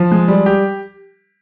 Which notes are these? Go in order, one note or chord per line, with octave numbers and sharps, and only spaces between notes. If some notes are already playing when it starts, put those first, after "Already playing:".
Already playing: F3
G#3
G3
G4